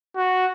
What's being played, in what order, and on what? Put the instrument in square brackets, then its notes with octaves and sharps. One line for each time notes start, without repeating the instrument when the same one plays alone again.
[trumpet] F#4